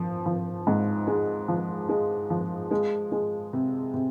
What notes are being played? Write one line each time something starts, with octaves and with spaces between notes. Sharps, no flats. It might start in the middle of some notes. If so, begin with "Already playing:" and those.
Already playing: F3
F3
G#2
G#3
F3
G#3
F3
G#3
G#3
C3
C3